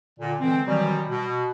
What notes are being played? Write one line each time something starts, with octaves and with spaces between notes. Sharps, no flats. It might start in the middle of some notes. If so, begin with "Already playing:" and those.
A#2 D3
D3 E3 G#3 C4
B2 D#3 E3 F#3 G3
B2